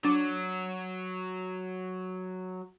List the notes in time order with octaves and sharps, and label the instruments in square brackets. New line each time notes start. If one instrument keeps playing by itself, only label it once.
[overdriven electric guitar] F#3 [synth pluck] D4